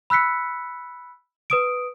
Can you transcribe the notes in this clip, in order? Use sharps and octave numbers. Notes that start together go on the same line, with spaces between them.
B5 E6 F#6 B6 C#7
B4 D#6 D7